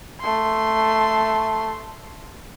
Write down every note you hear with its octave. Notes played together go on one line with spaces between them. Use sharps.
A3 C6